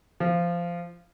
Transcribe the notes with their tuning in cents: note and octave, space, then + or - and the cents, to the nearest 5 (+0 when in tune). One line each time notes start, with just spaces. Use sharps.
F3 -15